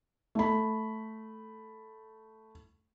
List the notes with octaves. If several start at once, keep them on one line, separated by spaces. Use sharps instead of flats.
A3 B5